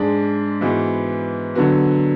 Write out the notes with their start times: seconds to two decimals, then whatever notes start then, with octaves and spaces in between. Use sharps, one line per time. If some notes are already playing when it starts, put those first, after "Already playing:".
Already playing: G#2 G#3 D4 G#4
0.61 G#2 E3 B3 F#4
1.55 D3 F#3 B3 F#4